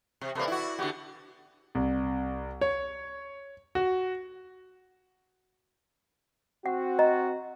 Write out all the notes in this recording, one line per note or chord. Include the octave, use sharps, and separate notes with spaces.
C3
C3 A#3 A4 B4 D5
E4 F#4
D3 B3 F#4 G4
C2
C#5
F#4
C4 F#4 F#5
D#5 A#5